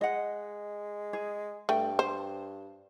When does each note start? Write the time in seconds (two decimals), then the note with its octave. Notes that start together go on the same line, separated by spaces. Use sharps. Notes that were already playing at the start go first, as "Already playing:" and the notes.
0.01 G#3 D#5 F#5
1.13 G#4
1.69 G2 A3 G5
1.99 C5